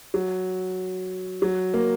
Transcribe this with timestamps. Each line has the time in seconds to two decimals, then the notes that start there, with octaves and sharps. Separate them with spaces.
0.14 F#3
1.42 F#3
1.74 A#3